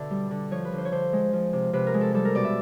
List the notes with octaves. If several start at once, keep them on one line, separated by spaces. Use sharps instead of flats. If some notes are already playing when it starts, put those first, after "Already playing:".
Already playing: B2 D3 D5 E5
G3
D3
F3 C#5
B4
D3
C5
C#5
D3 C5
G#3
F3
C3
C3 B4
A#4
G#3
A4
G3 A4
A#4
B2 D5
E5